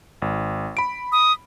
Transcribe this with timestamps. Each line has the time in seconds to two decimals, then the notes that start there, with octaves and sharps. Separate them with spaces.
0.22 G#1
0.77 B5 D7
1.12 D#6